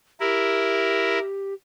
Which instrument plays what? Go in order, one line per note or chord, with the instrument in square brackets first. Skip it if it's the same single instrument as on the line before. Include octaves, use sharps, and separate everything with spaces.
[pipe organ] E4 A#4 [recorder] G4